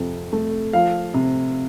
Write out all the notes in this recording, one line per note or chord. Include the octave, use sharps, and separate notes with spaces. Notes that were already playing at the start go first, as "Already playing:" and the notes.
Already playing: F2 C3
A3
F3 F5
C3